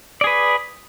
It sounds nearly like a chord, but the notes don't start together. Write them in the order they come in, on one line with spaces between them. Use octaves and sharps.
D5 G#4 B4